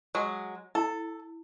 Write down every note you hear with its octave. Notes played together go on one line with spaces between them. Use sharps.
F#3 G#3
E4 A4